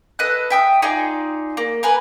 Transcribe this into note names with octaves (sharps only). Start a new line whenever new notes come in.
A4 B4 D#5 F#6
E5 G5 D#6
D#4 F4 G#4 D5
A#3
A#4 B4 G#5